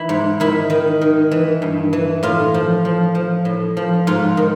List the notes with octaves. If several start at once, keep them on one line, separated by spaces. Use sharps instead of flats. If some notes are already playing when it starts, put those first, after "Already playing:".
Already playing: E3 E4
G#2
D#3 E4
D#3
D#3
E3
G2
E3
A2 F4
F3
F3
F3
A2
F3
G#2 F4
D#3